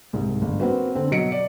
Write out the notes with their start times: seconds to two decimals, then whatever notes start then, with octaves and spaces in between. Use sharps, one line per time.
0.13 C2 G#2
0.42 G1
0.60 A#3 C4 F#4 B4
0.95 D3 C4
1.11 B2 F#3 D#5 C#7 D7
1.32 D5